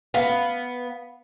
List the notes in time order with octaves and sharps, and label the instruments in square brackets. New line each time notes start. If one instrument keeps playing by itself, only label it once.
[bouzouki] B3 [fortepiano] F5